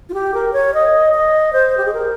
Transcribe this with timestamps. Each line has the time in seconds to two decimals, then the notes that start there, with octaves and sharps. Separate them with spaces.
0.09 F4
0.14 G4
0.34 A#4
0.53 C#5
0.74 D#5
1.14 D#5
1.53 C5
1.77 G4
1.85 G#4
1.94 A#4